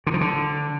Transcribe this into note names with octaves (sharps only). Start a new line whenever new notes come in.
D3
F3
D3